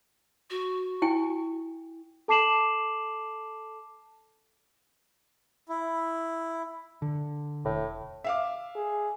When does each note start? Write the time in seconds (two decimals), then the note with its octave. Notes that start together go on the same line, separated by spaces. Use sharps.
0.50 F#4
1.02 E4 G5 G#5
2.28 A4 A5 D6 C7 E7 F#7
5.69 E4
7.02 D3
7.65 E1 A2
8.24 E5 F5 D6
8.76 G#4